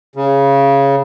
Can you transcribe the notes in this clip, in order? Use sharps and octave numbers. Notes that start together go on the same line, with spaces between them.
C#3